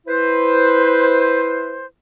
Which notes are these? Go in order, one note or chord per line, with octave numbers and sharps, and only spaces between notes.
E4 B4 C5